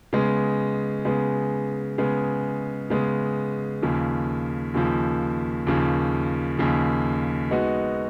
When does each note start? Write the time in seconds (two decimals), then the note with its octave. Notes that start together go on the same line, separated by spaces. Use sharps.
0.13 C#3 G#3 B3
1.05 C#3 G#3 B3
1.98 C#3 G#3 B3
2.90 C#3 G#3 B3
3.82 D#2 C#3 F3
4.74 D#2 C#3 F3
5.67 D#2 C#3 F3
6.59 D#2 C#3 F3
7.51 G#3 B3 D#4 F#4